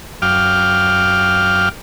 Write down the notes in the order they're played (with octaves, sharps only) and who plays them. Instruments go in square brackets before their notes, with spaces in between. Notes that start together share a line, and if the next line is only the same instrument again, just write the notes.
[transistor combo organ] F#2 F5 G5 D6 F6